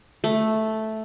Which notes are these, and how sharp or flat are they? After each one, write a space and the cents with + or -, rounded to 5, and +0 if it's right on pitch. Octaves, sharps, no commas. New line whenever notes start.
A3 -5